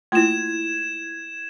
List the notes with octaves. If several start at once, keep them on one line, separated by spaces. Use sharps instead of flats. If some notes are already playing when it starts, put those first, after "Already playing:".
A3 A#3 E4 F4 C6 G#6 E7